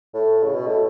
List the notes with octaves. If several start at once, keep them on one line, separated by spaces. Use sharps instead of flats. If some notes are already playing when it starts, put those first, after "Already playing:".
A2
C#3
B2
A2